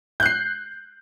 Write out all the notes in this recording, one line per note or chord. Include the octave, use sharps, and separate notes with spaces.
F#6 G6 C7